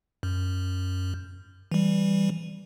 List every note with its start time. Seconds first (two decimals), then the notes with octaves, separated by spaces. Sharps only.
0.23 F#2
1.72 E3 G3